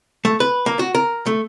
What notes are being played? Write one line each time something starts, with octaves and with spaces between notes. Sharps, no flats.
A3
B4
A#3
F#4
A#4
A3